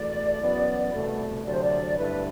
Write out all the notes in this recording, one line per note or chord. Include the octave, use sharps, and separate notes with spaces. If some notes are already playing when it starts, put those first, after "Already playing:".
Already playing: E2 B2 A3 D5
F#2 E3 B3 F#4
C2 B2 A3
D2 C3 F#3 D5
C5
D5
G2 D3 A3 E4 B4